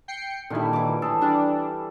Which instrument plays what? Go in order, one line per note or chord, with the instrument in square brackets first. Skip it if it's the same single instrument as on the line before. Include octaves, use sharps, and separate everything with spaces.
[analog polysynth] G5 C7 C#7
[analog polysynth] A#2 D#3 E4 [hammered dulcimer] D3 G3
[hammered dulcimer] E3 D6
[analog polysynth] A2 [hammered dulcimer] G#4 A4
[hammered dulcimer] G3 [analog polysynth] D4